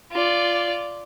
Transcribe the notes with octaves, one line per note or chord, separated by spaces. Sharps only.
F4 D5